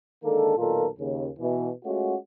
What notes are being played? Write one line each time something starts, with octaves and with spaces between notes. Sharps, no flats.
D3 D#3 G#3 A#3 A4
B1 A#2 D#3 F4 A4 A#4
D#2 C#3
B2 E3
G#3 A3 C#4 F4 F#4